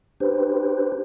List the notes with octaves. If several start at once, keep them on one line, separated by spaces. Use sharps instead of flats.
D4 G4 B4 C5